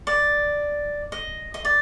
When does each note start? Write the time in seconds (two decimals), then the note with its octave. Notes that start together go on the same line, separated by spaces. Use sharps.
0.07 D5
1.12 D#5
1.54 D#5
1.65 D5